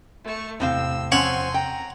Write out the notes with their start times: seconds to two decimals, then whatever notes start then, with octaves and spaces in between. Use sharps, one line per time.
0.25 A3 C#6
0.60 E2 A2 C3 C4 F5 E6
1.12 F3 C4 C#4 C#5 F#5 G#5 C6 C#6
1.54 G5 A#5